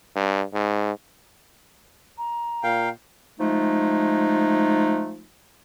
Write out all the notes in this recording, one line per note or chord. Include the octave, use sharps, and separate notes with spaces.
G2
G#2
A#5
A#2 F5 G5
F3 G#3 A3 D#4